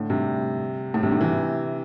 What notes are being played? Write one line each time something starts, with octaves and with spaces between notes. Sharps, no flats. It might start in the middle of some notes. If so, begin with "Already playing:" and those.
Already playing: A2 D3
G2 C3
A2
G2 C3
A2 D3
C3 E3